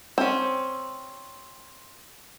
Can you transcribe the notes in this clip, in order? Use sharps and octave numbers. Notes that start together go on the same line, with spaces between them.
C4 C#4